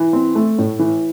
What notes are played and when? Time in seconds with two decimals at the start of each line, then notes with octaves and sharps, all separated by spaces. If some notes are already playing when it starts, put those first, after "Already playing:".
Already playing: E3
0.13 C4
0.35 A3
0.58 A2
0.79 E3